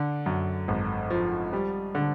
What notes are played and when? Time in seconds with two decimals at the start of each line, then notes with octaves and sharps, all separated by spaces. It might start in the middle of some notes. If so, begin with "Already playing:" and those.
Already playing: D3
0.26 F#2
0.68 G#1
1.10 F3
1.53 G3
1.95 D3